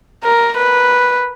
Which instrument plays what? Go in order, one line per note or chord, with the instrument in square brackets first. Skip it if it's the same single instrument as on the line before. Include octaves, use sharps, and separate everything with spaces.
[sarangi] A#4
B4